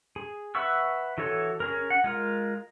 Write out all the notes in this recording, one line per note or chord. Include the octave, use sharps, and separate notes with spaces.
G#4
B4 E5 F#5 C#6 E6
E3 F#4 A4 C#5
C#4 G#4 A#4
F#5
G#3 F4 A#4